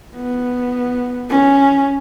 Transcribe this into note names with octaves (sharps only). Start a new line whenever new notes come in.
B3
C#4